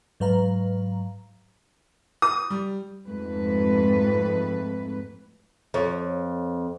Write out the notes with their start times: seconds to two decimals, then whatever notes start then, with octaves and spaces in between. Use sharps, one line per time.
0.20 G#2 F#3 B4 F5 A#5
2.22 D#6
2.50 G3
3.06 F2 G#2 A3 B4
5.74 F2 C#5